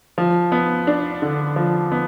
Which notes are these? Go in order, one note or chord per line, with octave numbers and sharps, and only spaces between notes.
F3
B3
D4
D3
F3
B3